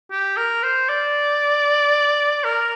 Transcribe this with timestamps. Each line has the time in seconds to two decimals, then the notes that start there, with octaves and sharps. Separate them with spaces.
0.11 G4
0.37 A#4
0.63 C5
0.89 D5
2.44 A#4